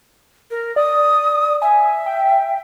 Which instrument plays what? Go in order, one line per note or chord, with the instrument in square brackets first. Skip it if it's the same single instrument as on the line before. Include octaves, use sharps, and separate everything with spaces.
[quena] A#4
[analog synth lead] D5 [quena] D#6
[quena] E5 [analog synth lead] G#5
[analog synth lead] G5